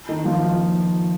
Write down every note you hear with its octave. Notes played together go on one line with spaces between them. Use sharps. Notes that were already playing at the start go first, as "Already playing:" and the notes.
D#3 D#4
F3 F4